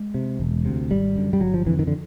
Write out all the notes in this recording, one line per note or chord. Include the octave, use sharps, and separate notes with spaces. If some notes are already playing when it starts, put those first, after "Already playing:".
Already playing: G#3
C3
E1
D2 C3
G#1 G3
F#2 D3
G3
G1 F#3
F3
F2 D3 E3
D#3
D3